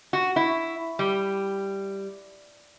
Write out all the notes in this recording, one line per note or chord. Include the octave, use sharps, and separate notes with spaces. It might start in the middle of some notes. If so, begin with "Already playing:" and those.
F#4
E4
G3